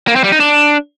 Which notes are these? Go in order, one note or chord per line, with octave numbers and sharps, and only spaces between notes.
A#3
C4
G3
D#4
D4